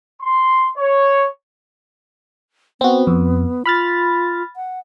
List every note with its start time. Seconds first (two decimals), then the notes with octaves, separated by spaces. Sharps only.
0.21 C6
0.78 C#5
2.81 B3 C4 F#4
3.07 F2
3.66 F4 B5 F6 A6
4.56 F#5